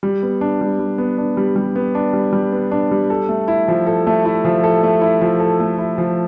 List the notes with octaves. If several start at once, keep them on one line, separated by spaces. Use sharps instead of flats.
G3
B3
D4
G3
G3
B3
D4
G3
G3
B3
D4
G3
G3
B3
D4
G3
A4
A3
E4
F3
A4
A3
E4
F3
A4
A3
E4
F3
A4
A3
E4
F3